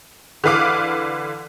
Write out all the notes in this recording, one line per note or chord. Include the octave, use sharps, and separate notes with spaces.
D3 E3 B4 F5 D6